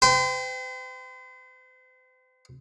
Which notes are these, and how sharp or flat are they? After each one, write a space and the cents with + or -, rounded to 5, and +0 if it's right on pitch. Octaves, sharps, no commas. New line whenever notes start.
C5 -40 G5 +0